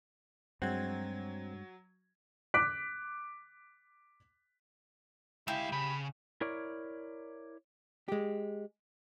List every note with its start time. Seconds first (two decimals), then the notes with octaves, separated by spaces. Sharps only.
0.62 G2 F#3 G#3 C4 F#5 G#6
2.54 D6 F#6 B6 D7
5.48 G#3 E4 G4 F5
5.72 C#3 B5
6.41 E4 A#4 C#5 D5
8.08 G#3 G4